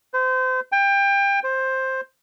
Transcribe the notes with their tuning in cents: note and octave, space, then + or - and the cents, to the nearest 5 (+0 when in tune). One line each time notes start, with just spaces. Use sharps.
C5 -30
G5 +25
C5 +10